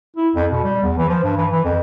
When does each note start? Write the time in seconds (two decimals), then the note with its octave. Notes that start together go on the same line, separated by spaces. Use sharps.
0.17 E4
0.35 F2
0.52 B2
0.64 G3
0.83 E2
0.98 E3
1.09 F3
1.23 G2
1.37 E3
1.52 E3
1.64 F2